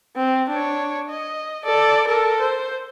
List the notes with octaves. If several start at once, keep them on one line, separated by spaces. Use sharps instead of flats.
C4
D4 C#5
D#5
A4 D5
A4 A#4
C5